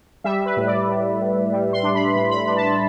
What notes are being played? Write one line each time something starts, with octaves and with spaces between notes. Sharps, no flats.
G3 E5
B4
A2
D5
A2
A2
G3
C6
D4
B5
A2 B5
B5
D4
A5
B5